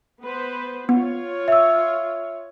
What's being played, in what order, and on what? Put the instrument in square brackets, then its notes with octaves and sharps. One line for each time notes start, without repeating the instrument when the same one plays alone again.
[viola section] B3 B4 C5
[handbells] B3 [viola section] F4 C#5
[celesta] E5 E6